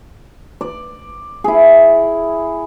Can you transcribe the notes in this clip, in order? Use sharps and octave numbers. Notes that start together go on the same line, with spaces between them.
D5
E4 G#4